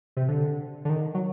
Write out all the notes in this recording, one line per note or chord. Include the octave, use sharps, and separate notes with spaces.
C3
D3
D3
D#3
F#3